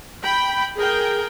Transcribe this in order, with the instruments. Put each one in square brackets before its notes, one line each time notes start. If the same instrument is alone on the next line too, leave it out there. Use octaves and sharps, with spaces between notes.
[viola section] G5 B5
G#4 A#4 G5